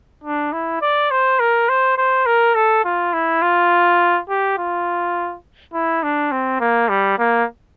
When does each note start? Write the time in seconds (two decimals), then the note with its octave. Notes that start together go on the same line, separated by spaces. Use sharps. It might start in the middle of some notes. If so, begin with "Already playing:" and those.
0.24 D4
0.52 E4
0.81 D5
1.11 C5
1.40 A#4
1.69 C5
1.98 C5
2.26 A#4
2.55 A4
2.85 F4
3.13 E4
3.42 F4
4.29 G4
4.58 F4
5.73 E4
6.03 D4
6.32 C4
6.60 A#3
6.89 G3
7.18 A#3